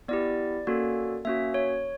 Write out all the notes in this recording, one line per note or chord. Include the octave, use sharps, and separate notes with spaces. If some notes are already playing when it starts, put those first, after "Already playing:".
B3 E4 G4 D5
A#3 C#4 F#4 A4
A#3 C#4 F#4 E5
C#5